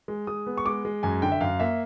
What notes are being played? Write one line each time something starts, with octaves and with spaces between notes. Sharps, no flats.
G#3
G#3 D#6
B3
C#6
G#3 D6
G#3
F#2 G#5
D3 G5
E5
F#2 F5
A#3 E5